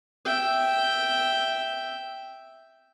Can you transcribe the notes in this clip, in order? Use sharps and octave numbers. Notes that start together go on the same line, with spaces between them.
E5 G5